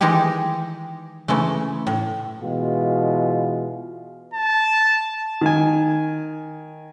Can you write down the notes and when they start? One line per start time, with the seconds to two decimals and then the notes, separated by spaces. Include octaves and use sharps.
0.01 D#3 E3 G#3 D#4 G4 G#4
1.28 C#3 E3 G#3 A3
1.87 A2
2.42 B2 E3 G#3 F4
4.34 A5
5.41 D#3 G#5